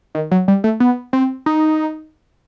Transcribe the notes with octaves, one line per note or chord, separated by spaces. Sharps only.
D#3
F#3
G3
A3
B3
C4
D#4